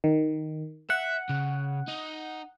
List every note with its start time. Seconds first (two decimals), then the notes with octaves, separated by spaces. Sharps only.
0.04 D#3
0.90 E5 F#5
1.29 C#3
1.88 D#4